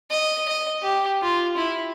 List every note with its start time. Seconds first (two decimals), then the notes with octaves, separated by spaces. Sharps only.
0.11 D#5
0.48 D#5
0.82 G4
1.23 F4
1.57 E4